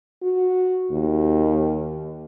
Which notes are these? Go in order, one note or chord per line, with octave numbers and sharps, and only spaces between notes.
F#4
D#2